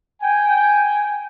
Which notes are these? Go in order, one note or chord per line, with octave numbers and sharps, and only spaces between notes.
G5 G#5